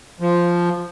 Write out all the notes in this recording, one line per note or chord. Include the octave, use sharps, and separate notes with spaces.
F3